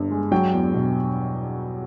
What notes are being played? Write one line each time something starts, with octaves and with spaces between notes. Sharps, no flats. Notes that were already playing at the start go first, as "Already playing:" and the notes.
Already playing: G1 G2
G#3
F#3 G5
E2
B2